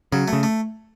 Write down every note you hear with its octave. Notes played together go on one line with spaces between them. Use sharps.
C#3 F#3
A3
C#3
A3